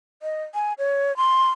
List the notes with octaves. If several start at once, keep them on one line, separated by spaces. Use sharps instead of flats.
D#5
G#5
C#5
C6